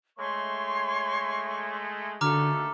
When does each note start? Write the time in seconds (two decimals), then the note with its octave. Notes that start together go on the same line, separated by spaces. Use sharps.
0.18 G#3 A3 C#5 C6 C#6
2.21 D#2 D3 A3 F#4 A4 A#5 D6 F6